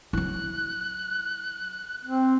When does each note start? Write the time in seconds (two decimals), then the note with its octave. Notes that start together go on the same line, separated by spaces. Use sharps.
0.13 F#3 E4 F#6
2.04 C4 F#6